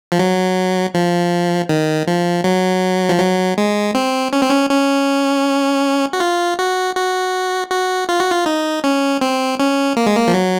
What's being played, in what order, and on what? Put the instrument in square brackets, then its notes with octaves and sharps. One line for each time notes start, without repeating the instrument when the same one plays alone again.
[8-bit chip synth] F3
F#3
F3
D#3
F3
F#3
F3
F#3
G#3
C4
C#4
C4
C#4
C#4
F#4
F4
F#4
F#4
F#4
F4
F#4
F4
D#4
C#4
C4
C#4
A#3
G#3
A#3
F3
F#3